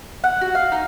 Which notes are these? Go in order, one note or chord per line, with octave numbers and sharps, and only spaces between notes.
F#5
F#4
F5
D#4